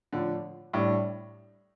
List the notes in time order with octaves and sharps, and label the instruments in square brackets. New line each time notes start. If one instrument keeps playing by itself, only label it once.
[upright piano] A2 F3 D4 [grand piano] D3
[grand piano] A2 [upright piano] G3 D4 G4 D5